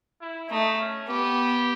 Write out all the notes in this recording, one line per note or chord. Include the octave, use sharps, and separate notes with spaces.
E4
A3 D#4
C#4
B3 G4